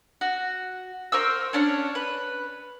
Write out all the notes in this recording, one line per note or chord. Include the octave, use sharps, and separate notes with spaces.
F#4
A#4 C5 C#6 E6
C#4 D4 C#5
B4